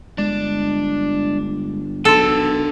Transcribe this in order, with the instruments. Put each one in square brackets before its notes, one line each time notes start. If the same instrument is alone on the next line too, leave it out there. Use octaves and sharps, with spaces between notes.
[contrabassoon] G1 [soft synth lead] G#3 [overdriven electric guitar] D4
[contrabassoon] B1 [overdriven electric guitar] D4 C6 [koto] A4 [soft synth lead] E6